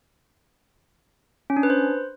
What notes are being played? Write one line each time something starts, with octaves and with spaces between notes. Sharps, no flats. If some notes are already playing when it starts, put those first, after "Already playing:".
C#4
D4
B4
C5